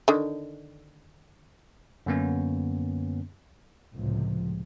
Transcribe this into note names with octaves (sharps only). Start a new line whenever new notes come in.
D3 D#3
F#2 D3 A#3 B3 C#4
C#2 A2 C3 F3